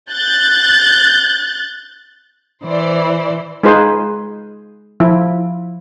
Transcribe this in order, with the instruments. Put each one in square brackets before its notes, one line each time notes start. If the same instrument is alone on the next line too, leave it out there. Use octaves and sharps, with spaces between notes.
[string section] F#6 G6 A6
[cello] E3 [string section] C5 D5
[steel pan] G#3 D#4 F4 G#4 B4 C5
F3 E4